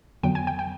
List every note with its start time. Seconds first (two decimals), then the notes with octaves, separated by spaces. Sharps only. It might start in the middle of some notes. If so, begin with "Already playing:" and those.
0.23 F2 D3 F#3 B3 G5
0.35 G#5
0.47 G5
0.59 G5